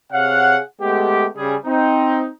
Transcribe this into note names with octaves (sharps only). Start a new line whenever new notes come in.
C3 G#4 C#5 F5 F#5
G#3 A3 B3 G4
C#3 G3 G#4
C4 D#4